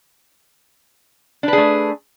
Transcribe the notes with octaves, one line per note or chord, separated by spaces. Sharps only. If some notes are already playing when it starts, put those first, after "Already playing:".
A3 D4 G#4 B4